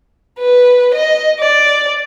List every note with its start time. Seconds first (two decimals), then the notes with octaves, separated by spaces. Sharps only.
0.38 B4
0.94 D#5
1.40 D5